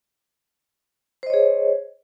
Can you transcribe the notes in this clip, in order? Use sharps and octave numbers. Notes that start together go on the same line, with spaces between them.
G#4 C5 C#5 D#5